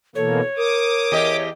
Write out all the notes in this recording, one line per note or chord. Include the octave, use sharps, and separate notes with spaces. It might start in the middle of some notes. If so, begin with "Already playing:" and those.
B2 E3 A#3 A4 C#5
A#4 D6 D#6
E2 G4 D#5